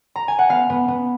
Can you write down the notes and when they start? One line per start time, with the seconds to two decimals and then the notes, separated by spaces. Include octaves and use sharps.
0.16 A#5
0.28 G#5
0.39 F#5
0.49 B3 F5
0.70 B3
0.88 B3